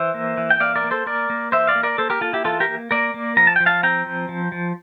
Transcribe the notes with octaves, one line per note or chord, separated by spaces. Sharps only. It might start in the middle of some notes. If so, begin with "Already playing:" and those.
Already playing: E3 C5 E5
A#3
E3
G5
A#3 D5 F5
A#4 D5
A#3
A4 C5
A#3 A#4 D5
A#3
E3 C5 E5
D5 F5
A#3
A#4 D5
A#3 A4 C5
G4 A#4
A#3 F4 A4
E4 G4
E3 F4 A4
G4 A#4
A#3
A#3 A#4 D5
A#3
F3 A#5
A5
F3 G5
F5 A5
C4 G5 A#5
F3
F3
F3